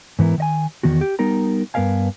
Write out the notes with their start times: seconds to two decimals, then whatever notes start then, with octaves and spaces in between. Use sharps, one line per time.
0.19 G#2 E3 B3 E4 A#4
0.38 D#3 D#5 G#5
0.83 E2 D#3 B3 F#4
1.01 G4
1.19 G3 B3 D#4 A#4 A#5
1.74 G2 B3 A#4 E5 F5 G#5